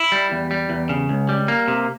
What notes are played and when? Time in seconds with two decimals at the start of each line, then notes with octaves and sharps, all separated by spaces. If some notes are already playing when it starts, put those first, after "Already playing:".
Already playing: E4
0.12 G3
0.32 E2
0.51 G3
0.70 E2
0.89 C#3
1.09 C#2
1.29 G3
1.48 A#3
1.68 C3